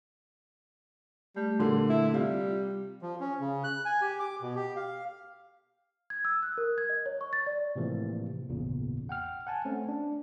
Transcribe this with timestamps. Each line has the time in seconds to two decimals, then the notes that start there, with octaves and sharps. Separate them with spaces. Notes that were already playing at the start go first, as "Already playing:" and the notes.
1.36 G3 A3
1.59 A#2 D3
1.90 E4
2.13 C3 G3 F4 F5
3.02 F3
3.20 C#4
3.40 C#3
3.64 F#6
3.85 G#5
4.01 G4
4.19 D6
4.42 B2
4.55 G4
4.76 F5
6.10 G#6
6.25 E6
6.42 F#6
6.58 A#4
6.78 G#6
6.89 D#5
7.06 C#5
7.21 C#6
7.33 A6
7.47 D5
7.76 A2 C3 E3 F3 A#3
8.49 G#1 E2 A#2 C#3
9.09 F#5 G5 F6
9.47 F#5 G#5 A5
9.65 A3 C4 C#4
9.89 D4